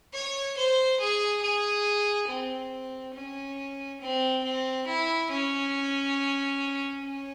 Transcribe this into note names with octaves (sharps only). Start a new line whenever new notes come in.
C#5
C5
G#4
G#4
C4
C#4
C4
C4
E4
C#4
C#4